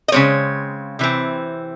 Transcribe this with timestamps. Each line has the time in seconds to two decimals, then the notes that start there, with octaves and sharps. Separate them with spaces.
0.08 D#5
0.12 C#3 G#3 C4 C#5
0.99 C3 E3 C4